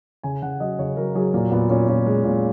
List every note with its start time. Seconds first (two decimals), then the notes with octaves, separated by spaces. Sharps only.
0.23 C#3 G#5
0.42 C#3 F#5
0.60 F#3 D#5
0.79 C#3 C#5
0.97 F#3 A#4
1.15 F#3 G#4
1.34 A#2 A#3
1.52 A#2 B3
1.70 A#2 C#4
1.88 A#2 C#4
2.06 G#3
2.24 A#2